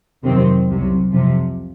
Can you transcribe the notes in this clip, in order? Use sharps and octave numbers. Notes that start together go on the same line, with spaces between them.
F2 C3 D#3 F#3 C4
C2 C3 F#3
F2 C3 F3